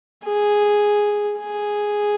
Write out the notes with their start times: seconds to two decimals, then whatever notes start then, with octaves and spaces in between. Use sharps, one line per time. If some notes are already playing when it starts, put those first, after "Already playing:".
0.25 G#4
1.39 G#4